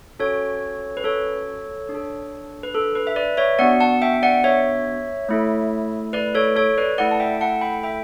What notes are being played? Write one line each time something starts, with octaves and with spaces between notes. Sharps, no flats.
C#4 F#4 A4 C#5
B4
A4 C#5
D4
A4
B4
A4
B4
E5
B4 D5
C#5 E5
B3 D4 F#4 D5 F#5
F#5 A5
E5 G5
D5 F#5
C#5 E5
A3 E4 A4
B4 D5
A4 C#5
A4 C#5
B4 D5
A3 E4 A4 D5 F#5
A5
E5 G5
F#5 A5
G5 B5
E5 G5